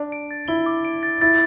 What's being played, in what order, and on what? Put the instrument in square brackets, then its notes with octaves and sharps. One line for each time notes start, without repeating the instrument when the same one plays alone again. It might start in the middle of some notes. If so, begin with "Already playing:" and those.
Already playing: [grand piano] D4
[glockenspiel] D7
A6
[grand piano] E4 [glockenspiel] G7
[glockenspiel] D6
D7
A6
[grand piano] E4 [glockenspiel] A6